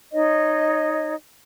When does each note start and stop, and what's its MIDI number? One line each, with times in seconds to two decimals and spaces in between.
0.13 1.14 63
0.13 1.14 73
0.13 1.14 75